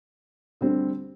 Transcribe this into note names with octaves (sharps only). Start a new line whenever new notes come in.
D2 D3 G3 C4